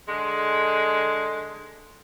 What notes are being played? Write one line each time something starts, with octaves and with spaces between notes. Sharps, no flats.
D3 G#3